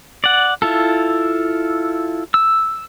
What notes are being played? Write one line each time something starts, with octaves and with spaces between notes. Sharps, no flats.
D5 F#5
E4 F4 A4
E6